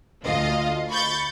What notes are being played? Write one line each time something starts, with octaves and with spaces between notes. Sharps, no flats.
D2 F4 D#5 F5
B5 C#6 G6 A6